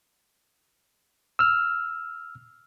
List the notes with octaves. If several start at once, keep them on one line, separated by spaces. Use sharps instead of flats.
E6 F6